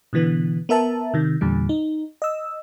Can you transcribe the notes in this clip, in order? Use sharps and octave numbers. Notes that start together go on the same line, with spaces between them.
B2 D3 E3 B3
B3 A#4 E5 A5
C3 D#3
E2 A#2 D3 G3
D#4
D#5 E6